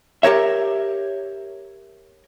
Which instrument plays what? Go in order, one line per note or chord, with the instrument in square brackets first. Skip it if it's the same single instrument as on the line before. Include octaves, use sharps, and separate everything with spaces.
[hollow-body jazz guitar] G4 A#4 C#5 E5